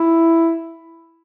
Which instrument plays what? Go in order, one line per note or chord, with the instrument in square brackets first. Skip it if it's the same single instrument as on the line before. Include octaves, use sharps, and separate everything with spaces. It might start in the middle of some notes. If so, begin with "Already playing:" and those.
Already playing: [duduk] E4